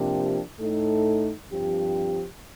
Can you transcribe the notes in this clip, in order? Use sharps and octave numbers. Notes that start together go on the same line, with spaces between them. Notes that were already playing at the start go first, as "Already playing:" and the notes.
Already playing: C3 F3 A#3 D4 G4
A2 A3 D#4 A4
G2 F3 C4 G4